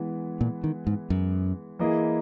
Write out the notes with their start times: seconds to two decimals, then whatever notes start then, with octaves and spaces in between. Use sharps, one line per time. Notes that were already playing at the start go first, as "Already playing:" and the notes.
Already playing: E3 G#3 B3 E4
0.41 A#2
0.64 D#3
0.87 G#2
1.10 F#2
1.79 E3 A#3 E4 G#4 D#5